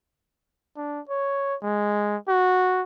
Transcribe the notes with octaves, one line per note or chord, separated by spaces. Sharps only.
D4
C#5
G#3
F#4